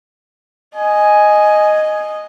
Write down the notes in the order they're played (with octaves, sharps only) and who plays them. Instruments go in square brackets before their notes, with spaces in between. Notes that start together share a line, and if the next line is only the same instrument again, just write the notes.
[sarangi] D#5 [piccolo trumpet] G#5